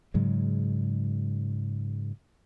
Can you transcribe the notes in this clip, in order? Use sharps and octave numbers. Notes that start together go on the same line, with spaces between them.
G#2 C#3 F#3 G#3